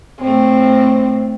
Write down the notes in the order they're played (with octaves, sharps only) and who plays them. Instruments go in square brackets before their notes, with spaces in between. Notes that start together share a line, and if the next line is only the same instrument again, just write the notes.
[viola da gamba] A2 A3 [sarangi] C4